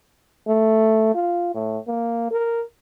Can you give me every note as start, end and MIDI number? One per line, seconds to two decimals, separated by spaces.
0.47 1.13 57
1.14 1.51 65
1.55 1.78 45
1.87 2.27 58
2.31 2.65 70